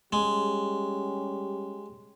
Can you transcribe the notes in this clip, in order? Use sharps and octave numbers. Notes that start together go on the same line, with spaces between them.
G3 G#3 C#4 G4